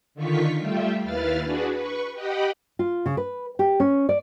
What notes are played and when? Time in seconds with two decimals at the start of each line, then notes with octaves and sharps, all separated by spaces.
0.15 D3 D#3 F4 C#6 B6
0.60 G3 A3 F4 G4 E5
1.03 D#2 E4 B4 F5 F6 A6
1.43 D4 F#4 G#4 B4
1.74 B4 C#6
2.14 G4 D#5 F#5 G5 B5
2.79 F4
3.06 C#3
3.17 B4
3.59 G4
3.80 C#4
4.09 D5